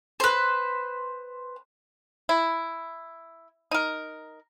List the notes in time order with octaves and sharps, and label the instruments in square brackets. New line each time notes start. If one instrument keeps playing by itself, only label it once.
[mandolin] B4 C5
[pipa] E4
D#4 A#4